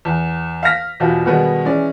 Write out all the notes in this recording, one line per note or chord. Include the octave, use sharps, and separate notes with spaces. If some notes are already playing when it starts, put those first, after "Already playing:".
E2
F5 F6 A#6 B6
E2 B2 F3 G4 F5
B2 D#3 G3 G#3 B3
E3 G#3 C#4 D5